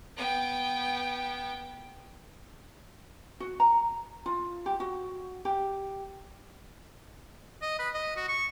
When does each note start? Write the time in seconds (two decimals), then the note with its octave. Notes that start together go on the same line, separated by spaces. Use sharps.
0.17 B3 G5
3.40 F#4
3.60 A#5
4.26 F4
4.66 G4
4.80 F#4
5.45 G4
7.62 D#5
7.79 B4
7.94 D#5
8.16 F#4
8.28 C#6